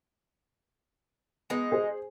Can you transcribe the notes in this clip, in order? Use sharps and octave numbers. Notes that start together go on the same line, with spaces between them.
G#3 B3 D#4
G#4 C5